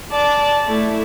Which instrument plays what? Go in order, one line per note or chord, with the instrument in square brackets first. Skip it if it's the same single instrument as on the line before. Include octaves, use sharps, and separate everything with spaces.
[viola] D5 A5
A3 E4